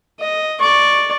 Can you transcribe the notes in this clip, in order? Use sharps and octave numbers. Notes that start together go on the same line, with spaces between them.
D#5
D5 C#6